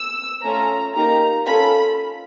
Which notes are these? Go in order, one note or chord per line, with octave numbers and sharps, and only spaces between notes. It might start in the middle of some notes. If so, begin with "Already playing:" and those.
Already playing: E6
A3 C#4 F4 A#5
A#3 D#4 G4 A#5
C#4 F4 A4 B5